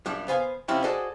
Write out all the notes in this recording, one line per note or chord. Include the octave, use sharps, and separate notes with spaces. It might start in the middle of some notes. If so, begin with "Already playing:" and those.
F#2 A#2 G3 D4
B3 C5 F5 G#5
C3 F3 G3 C4 C#4 E4
F#4 G#4 A4 C5 D5 D#5